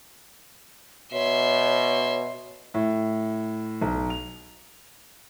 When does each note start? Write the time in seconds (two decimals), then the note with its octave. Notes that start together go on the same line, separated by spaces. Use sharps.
1.13 B2 C#5 E5 C6
2.74 A2
3.81 B1
4.10 F7